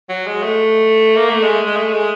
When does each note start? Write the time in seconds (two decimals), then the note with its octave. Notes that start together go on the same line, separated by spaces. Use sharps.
0.09 F#3
0.27 G#3
0.43 A3
1.16 A#3
1.30 A3
1.43 G#3
1.66 G#3
1.76 A3
1.93 G#3